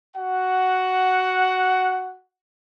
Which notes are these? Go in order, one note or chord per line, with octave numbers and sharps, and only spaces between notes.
F#4 F#5